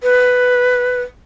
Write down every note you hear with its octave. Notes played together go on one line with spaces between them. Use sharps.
B4